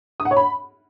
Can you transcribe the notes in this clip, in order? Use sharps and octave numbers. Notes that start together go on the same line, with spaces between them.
D#6
F#5
C#5
B5